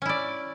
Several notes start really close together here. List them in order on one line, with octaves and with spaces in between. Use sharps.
C#4 E4 D5